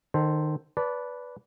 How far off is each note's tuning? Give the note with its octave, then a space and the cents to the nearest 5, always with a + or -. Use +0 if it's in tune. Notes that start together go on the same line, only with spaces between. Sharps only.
D#3 -25 A4 +0 C5 +0
B4 -5 D5 -20 A5 +0